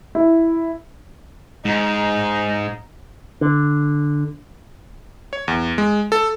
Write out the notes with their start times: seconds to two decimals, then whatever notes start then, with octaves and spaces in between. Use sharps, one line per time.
0.15 E4
1.65 G#2 D#4
3.41 D3
5.33 C#5
5.48 E2
5.78 G#3
6.12 A4